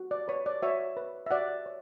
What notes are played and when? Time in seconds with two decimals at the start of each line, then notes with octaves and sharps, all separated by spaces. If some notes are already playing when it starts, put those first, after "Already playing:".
Already playing: F#4
0.11 D5
0.28 B4 C#5
0.46 D5
0.62 F#4 C#5 E5
0.97 B4
1.26 E5
1.31 F#4 D5 F#5
1.66 C#5